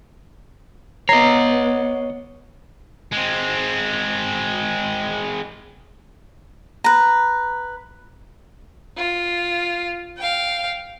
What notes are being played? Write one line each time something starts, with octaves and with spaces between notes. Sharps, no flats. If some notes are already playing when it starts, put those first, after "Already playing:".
B3 C#5 D#5 A#5 C7
G#3 C4
B4 A#5
F4
F5 G5